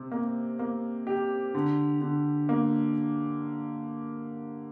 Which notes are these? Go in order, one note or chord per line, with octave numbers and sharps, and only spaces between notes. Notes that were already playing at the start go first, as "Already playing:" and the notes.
Already playing: C3
A#3
A#3
G4
D3
D3
A#3